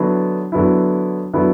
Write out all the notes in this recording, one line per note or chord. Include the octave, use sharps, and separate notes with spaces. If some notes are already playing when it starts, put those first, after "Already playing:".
Already playing: D3 F#3 B3 E4
D3 F#3 B3 E4
D3 F#3 B3 E4